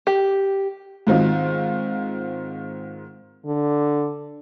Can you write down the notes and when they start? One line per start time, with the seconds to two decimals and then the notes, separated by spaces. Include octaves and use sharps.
0.07 G4
1.07 G#2 D#3 C4 F4
3.45 D3